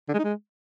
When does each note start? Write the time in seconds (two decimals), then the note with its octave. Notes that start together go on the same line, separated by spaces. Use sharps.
0.09 D3
0.14 G#3
0.19 D#4
0.24 G#3